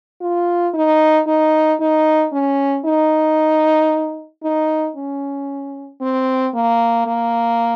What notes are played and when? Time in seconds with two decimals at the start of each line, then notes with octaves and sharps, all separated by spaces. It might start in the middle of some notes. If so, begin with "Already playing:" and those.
0.21 F4
0.74 D#4
1.26 D#4
1.80 D#4
2.32 C#4
2.85 D#4
4.43 D#4
4.96 C#4
6.01 C4
6.54 A#3
7.06 A#3